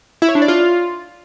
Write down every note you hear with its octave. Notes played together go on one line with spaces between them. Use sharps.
E4
C#5
D4
D5
F4